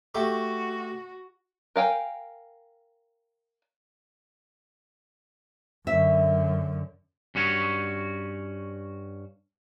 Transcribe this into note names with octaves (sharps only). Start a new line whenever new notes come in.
A3 F#4 G4
A#4 F5 G5 G#5
F#2 D3 E5
G2 C#4 F#4 C#5